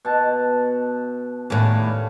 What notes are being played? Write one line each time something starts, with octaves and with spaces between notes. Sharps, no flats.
B2 A5
D#2 A2 C#3 C#4 D4